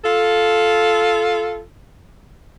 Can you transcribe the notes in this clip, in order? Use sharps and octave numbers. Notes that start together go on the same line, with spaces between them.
F4 A4